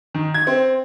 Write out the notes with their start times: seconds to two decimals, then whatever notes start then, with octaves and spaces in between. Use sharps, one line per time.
0.14 D#3
0.34 G#6
0.47 C4